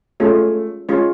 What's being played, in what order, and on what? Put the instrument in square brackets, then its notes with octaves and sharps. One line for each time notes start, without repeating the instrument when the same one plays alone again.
[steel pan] G#3 C#4 F4 G#4 C#5 [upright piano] A3
[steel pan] G#3 C#4 F4 G#4 C#5